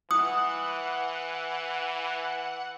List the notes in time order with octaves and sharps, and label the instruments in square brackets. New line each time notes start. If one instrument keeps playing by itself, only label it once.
[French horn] E3 [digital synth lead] F#5 [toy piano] D#6